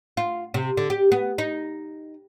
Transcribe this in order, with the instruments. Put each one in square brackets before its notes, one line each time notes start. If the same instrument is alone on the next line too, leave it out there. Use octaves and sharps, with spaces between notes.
[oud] F4
C3
D3
G4
B3
D#4